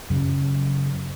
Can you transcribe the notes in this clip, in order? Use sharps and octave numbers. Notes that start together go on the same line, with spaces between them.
F#2 C#3